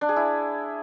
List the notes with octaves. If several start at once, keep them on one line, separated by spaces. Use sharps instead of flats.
D4
G#4
E4